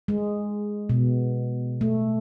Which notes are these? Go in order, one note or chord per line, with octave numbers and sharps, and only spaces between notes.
G#3
B2
A3